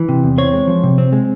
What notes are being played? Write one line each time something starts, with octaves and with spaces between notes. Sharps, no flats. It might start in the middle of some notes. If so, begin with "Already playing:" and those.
Already playing: E3
C3
E2
C4 C#5
G#3
F3
C3
C4
G#3